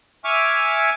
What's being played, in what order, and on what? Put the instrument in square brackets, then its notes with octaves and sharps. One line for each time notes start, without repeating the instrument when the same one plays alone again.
[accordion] E5 G#5 C#6 D6 F6